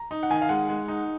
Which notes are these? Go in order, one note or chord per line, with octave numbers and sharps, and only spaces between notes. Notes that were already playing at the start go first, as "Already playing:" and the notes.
Already playing: A#5
D#4
F#5
D#3 G#5
F5
G#3 F#5
G#3
D#4